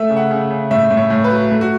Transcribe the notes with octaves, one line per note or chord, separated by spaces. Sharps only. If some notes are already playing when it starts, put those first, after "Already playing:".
Already playing: A3 E5
C#3
F#5
C#3
C#3
A2 E5
A2
C#5
A2
B4
F#3
A3
F#4